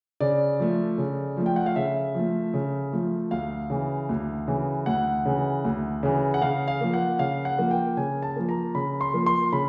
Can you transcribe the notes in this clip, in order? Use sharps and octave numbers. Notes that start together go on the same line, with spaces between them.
C#3 D5
F3 A3
C#3
F3 A3
G5
F#5
F5
C#3 E5
F3 A3
C#3
F3 A3
D2 F5
C#3 E3
D2
C#3 E3
D2 F#5
C#3 E3
D2
C#3 E3
F#5
C#3 F5
F5
F3 A#3
F#5
C#3 F5
F#5
F3 A#3
G5
C#3 G#5
A5
F3 A#3
A#5
C#3 B5
C6
F3 A#3
C6
C#3 B5